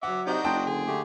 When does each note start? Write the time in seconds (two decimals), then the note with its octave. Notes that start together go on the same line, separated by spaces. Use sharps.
0.03 F#3 E5 F#5 D6
0.27 C3 D4 D#4 F#4 D#5 G6
0.44 F#1 G5 A5 C6
0.67 D3 G#4
0.87 D3 A3 G4